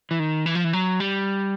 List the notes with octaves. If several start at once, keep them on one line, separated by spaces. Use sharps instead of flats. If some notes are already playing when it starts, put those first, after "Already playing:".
E3
D#3
E3
F3
E3
F#3
G3